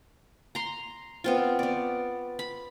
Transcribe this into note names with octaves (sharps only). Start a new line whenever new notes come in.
A#5 C6
B3 C4 F4
B3 D5
B5